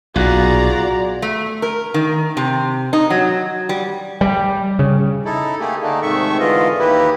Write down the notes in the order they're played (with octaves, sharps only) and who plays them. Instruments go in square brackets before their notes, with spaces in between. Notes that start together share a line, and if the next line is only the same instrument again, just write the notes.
[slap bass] B1 A#2 [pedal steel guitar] F4 G#4 F#5 [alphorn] F#4 [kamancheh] D5 A#5
[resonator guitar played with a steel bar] A3
A#4
D#3
C3
D#4
F#3
G3
[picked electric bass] G3
C#3
[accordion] D#4 E4 A4
A3 A#3 G4 G#4
D3 A3 A#3 D4 D#4
G#2 C3 D#3 A3 E5 C#6
G#2 D3 E3 F4 D#5
D#2 E3 A#3 E4 G4 B4